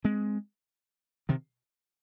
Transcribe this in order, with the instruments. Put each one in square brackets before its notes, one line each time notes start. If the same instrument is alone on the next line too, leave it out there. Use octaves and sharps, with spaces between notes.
[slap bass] G#3 C4
C3 D#3